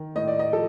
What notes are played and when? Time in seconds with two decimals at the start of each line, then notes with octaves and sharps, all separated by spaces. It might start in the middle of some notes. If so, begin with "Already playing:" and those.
Already playing: D#3
0.15 A2 D#5
0.27 D5
0.39 D#5
0.52 F3 A4